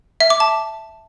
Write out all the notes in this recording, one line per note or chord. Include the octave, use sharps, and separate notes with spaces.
E5
D6
A5